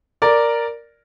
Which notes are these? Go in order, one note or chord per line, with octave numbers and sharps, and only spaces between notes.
A#4 D5